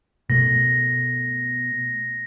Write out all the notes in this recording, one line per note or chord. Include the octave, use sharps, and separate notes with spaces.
B2 A3 A#6